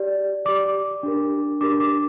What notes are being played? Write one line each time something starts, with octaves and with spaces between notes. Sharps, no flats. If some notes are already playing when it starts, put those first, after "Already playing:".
Already playing: G4 D5
G4 D5 D6
D4 G4 A#4
D4 G4 A#4 D6
D6